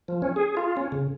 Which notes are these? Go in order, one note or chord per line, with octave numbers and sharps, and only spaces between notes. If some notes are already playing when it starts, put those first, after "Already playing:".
F3
C#4
G#4
F4
C#4
C#3